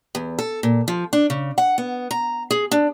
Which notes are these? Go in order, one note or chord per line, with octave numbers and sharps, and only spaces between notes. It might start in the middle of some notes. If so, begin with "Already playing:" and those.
E2
A4
A#2
F3
D4
C#3
F#5
B3
A#5
G#4
D4